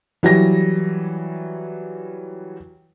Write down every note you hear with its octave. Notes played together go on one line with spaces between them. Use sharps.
E3 F#3 G3 A#6